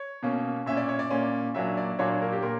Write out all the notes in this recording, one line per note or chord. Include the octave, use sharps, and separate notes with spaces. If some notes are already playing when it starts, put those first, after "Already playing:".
Already playing: C#5
B2 A#3 C#4
A#2 A#3 C#4 E5
D5
C#5
D5
A#2 A#3 C#4
A#2 F#3 A#3 D4 E5
D5
A#2 F#3 A#3 D4 C#5
C#5
A#4
G4
A#2 A#4